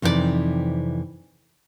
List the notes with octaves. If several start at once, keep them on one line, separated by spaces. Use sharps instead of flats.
F2 C3 E3 D#4 G#4 D5